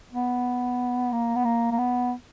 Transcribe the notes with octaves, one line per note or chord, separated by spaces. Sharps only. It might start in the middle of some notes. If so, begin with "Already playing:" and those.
B3
A#3
B3
A#3
A#3
B3